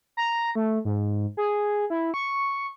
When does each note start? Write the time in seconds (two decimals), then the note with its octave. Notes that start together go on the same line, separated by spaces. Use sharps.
0.17 A#5
0.55 A3
0.85 G#2
1.37 G#4
1.90 E4
2.14 C#6